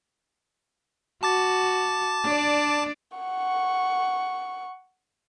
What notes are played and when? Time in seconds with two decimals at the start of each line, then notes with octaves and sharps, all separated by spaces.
1.23 F#4 A5 D6 A6
2.24 D4 D5
3.17 F#5 C#6